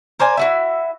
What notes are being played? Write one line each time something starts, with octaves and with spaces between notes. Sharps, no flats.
A#4 C5 D5 G#5
E4 F#4 E5